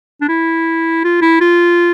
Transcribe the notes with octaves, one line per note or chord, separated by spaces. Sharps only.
D4
E4
F4
E4
F4